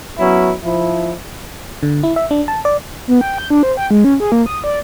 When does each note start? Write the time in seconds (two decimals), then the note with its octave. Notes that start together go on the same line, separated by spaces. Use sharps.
0.18 F#3 B3 C#4 E4
0.64 F3 E4
1.83 D3
2.03 E4
2.16 E5
2.31 D4
2.48 A5
2.65 D5
3.08 B3
3.21 G5
3.38 G6
3.50 D4
3.63 C5
3.77 G5
3.91 G#3
4.04 C#4
4.20 G#4
4.32 A#3
4.46 D#6
4.64 D5